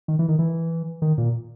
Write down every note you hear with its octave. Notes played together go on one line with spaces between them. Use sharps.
D#3
E3
D#3
E3
D#3
A#2